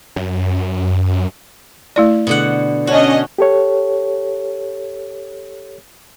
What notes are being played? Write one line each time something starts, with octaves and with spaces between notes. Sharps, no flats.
F#2
A3 E4 D5
B2 D3 F#5
C#4 D4 F#4 D#5
G4 A4 C#5